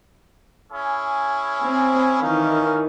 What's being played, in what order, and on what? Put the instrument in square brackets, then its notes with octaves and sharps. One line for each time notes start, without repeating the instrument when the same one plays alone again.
[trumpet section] C#4 E4 G#4
[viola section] C4
[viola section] D#3 E3 [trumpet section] C#4 D#4 F5